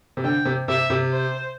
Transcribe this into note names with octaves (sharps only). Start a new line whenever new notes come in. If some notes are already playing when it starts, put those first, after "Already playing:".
C3
D3 G5
C3
C3 E5
C3
C5